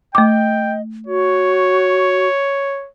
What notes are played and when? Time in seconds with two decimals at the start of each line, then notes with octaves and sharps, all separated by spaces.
0.15 A3 D#5 G5 D6
1.07 F#4 C#5